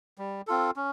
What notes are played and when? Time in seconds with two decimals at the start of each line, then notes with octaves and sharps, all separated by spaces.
0.18 G3
0.47 C4 F4 A4
0.76 C#4